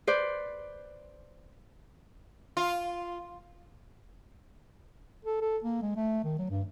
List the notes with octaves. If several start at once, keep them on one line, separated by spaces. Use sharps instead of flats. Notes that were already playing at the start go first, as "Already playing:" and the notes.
B4 C5 D5
F4
A4
A4
A#3
G#3
A3
D#3
F#3
G2